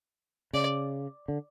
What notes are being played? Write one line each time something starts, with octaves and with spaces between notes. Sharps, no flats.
C#3 D5
D3